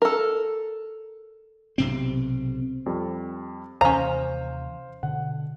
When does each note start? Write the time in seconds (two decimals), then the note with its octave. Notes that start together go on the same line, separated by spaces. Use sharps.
0.02 A4 A#4
1.78 B1 C3 C4
2.86 F2 G3
3.81 D#2 C3 E3 C#4 C5 F5 A#5
5.03 B2 D3 F#5